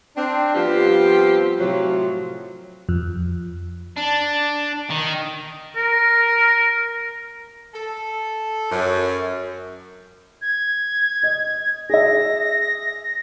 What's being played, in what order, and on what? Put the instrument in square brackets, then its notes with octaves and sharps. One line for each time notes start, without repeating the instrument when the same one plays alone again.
[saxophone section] C4 D4
F3 G3 B3 C4 F4 G4
A2 C3 F3 F#3
[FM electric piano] F2
[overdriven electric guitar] D4
D#3
[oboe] A#4
[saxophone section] A4
F#2
[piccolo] G#6
[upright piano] D#5
[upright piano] G#4 E5 [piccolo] A#6